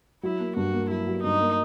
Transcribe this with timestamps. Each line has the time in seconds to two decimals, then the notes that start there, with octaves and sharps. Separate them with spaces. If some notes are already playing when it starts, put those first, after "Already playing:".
0.23 F#3 E4
0.40 A#3
0.56 G2 F#4
0.73 A#3
0.90 F#3 E4
1.07 F#3
1.24 G2 D#4
1.41 A#3